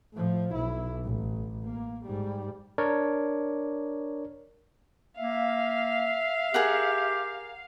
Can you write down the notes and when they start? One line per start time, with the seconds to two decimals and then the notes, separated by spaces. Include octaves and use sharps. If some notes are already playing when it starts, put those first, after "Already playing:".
0.13 A2 F3
0.54 B1 E4
1.03 A1
1.64 A#3
2.05 G#2 G3
2.78 D4 A#4 C#5 D5
5.19 A#3 E5 F5
6.54 G4 G#4 A#4 F#5